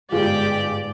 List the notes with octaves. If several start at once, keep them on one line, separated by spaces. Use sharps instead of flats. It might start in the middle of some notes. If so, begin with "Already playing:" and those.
G1 G#2 F4 G4 G#4 D5